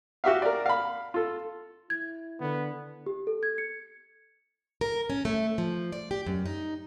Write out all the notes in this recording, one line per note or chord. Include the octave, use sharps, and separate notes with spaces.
F#4 G4 E5 F5
A#4 D5
F5 B5
F4 A4
E4 G#6
D3 B3
G4
A4
G#6
C#7
A#4
C#4
A3
F3
D5
G4
F#2
D#4